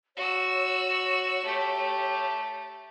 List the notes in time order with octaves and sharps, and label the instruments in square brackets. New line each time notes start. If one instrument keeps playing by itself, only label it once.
[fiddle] F#4 E6 [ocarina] C#5
[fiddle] A3 G4